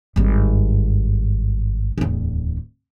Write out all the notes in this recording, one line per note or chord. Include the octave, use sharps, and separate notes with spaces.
G#1 G2
D1 E2